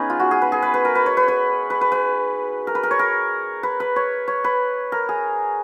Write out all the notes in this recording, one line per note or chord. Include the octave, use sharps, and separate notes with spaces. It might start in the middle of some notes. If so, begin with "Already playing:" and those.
Already playing: B3 C#4 D#4 G#4 B4
F4
F#4
G#4
B4
G#4
B4
B4
A#4
B4
C#5
B4
B4
B4
B4
B4
A#4
B4
A#4
C#5
A#4
B4
B4
C#5
C#5
B4
A#4
G#4